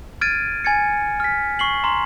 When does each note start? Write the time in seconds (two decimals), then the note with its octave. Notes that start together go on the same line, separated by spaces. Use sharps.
0.21 F6 G#6 A6 D7 D#7
0.64 G#5 G#6 A6 C#7
1.20 F6 B6
1.59 C#6 C7 F#7
1.84 A#5 C6